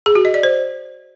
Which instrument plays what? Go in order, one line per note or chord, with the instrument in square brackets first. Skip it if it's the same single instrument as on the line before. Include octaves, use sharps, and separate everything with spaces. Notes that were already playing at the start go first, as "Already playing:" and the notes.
[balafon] G#4
F#4
D#5
D5
C5